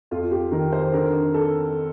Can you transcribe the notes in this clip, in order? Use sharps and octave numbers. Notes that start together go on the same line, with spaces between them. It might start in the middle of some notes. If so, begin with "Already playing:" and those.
F2 F4
G4
D#3 A#4
C5
D3 A#4
A4